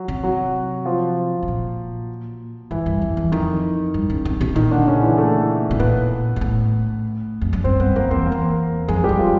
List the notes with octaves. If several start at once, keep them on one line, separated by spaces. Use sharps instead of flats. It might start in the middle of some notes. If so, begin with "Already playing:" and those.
Already playing: F#3 F#4
C3
F#3 F#4
F3 F4
A2
A#2
G#2 E3 E4
G2
F2
E2
F2 D#3 D#4
G2
C#3
C3
B2
A#2 D#3 D#4
D3 D4
C#3 C#4
E3 E4
A3 A4
B2
A#2 B3 B4
G#2
A2
F2
F#2
G2 C4 C5
G2 B3 B4
F2 A#3 A#4
E2 C4 C5
A#3 A#4
E2
F2 G#3 G#4
F2 G3 G4
F3 F4